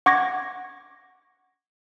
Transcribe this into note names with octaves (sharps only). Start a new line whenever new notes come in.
F#5 C#6 D6 G#6 A#6